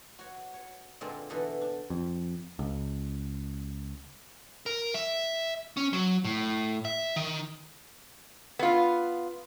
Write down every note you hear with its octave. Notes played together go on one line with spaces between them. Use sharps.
F#4 C#5
C#5
A#2 D3 G#3 C4 F4 A5
B2 D3 E3 F#4 A4 B4
D4
F2
C#2
A#4
E5
C#4
F#3
A2
E5
D#3
B3 F4